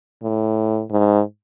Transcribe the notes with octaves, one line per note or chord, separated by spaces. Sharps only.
A2
G#2